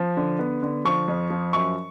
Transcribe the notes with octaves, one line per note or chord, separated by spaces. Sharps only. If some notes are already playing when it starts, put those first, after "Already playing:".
Already playing: F3
D3
B3
D3
F3 C#6
F2
F3
F#2 C#6